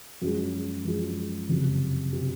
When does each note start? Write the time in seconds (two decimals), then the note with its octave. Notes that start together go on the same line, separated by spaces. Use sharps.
0.22 F#2 F3 G#3
0.84 F#2 F3 G#3
1.49 F#1 F2 C3
2.13 C3